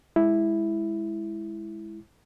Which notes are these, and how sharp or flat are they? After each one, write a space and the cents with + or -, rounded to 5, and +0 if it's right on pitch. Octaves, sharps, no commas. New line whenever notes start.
G#3 +0 E4 +0